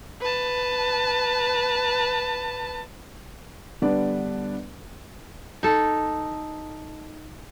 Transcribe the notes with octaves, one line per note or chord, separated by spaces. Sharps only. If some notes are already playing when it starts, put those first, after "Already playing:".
B4 A5
D3 G3 B3 D4 B4 D5
D#4 A4